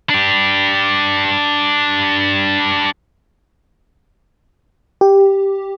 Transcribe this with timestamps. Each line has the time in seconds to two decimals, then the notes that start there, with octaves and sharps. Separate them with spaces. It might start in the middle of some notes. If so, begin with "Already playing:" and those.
0.10 D4 G4
5.01 G4